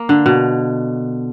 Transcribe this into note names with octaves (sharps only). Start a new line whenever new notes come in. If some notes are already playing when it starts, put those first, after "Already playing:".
Already playing: A#3
D3
B2